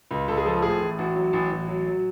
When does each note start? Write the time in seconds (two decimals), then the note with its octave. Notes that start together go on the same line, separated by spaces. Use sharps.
0.11 C#2
0.28 C#2 A4
0.38 G#4
0.46 F3 A4
0.62 A2 G#4
0.81 A1
0.99 A1 F#4
1.16 F#3
1.33 A1
1.51 A1
1.68 F#3
1.86 F#3